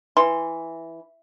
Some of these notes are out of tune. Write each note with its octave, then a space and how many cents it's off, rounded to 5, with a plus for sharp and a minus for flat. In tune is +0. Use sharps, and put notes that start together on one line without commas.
E3 +0 C6 -10